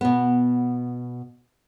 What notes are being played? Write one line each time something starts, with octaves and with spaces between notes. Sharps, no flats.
B2 B3